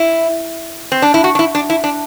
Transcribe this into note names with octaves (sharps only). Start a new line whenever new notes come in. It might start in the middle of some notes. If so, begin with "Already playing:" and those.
Already playing: E4
C4
D4
E4
F#4
D4
E4
D4
E4
D4